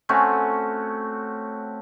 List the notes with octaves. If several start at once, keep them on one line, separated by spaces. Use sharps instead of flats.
A3 C4 C#4 F#4